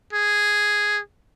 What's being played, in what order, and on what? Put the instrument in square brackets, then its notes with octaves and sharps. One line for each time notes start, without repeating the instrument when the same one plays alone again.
[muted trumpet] G#4